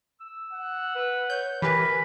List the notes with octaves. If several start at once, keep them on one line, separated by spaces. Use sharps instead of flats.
E6
F#5
B4
C#5 G6
E3 G4 A#4 B4 G#5 B5